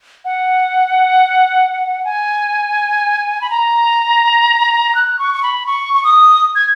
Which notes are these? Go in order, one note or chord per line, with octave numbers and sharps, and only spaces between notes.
F#5
G#5
B5
A#5
F#6
C#6
C#6
B5
C#6
C#6
D#6
G#6